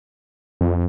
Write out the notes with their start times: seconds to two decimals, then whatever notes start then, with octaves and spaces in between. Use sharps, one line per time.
0.61 F2